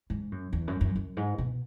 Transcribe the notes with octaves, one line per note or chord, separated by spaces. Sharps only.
G#2
F#2
E2
F#2
F#2
F#2
G#2
B2